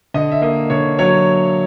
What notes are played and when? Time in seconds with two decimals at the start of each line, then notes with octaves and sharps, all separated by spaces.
0.14 D3 D#5
0.31 E5
0.42 A#3 D#5
0.70 D3 C#5
0.99 F#3 C#5